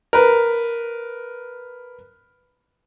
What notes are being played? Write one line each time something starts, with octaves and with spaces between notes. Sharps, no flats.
A#4 B4